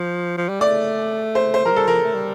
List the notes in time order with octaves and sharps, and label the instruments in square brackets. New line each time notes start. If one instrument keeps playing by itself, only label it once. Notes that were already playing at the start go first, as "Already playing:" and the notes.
Already playing: [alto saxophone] F3
F3
G3
[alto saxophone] A3 [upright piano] D5
[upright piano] C5
C5
[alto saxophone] F3 [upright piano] A#4
[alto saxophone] G3 [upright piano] A4
[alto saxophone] F3 [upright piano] A#4
[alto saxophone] A3
G3